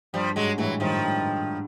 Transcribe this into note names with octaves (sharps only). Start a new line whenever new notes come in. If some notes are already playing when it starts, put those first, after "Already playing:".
G2 F3 G3
G#2 F#3 G#3
A2 E3 F#3
G2 D#3 F3
G2